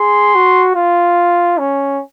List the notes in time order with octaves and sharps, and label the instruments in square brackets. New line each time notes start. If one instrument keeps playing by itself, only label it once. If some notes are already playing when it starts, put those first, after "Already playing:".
Already playing: [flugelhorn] G#4 [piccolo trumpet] C6
[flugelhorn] F#4
F4
C#4